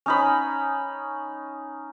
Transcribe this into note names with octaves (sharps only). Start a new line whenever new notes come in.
C#4 D#4 B5